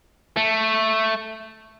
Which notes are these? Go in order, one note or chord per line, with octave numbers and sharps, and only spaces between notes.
A3